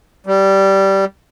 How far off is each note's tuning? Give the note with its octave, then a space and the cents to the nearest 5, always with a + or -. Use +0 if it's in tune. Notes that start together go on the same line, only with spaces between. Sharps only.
G3 -10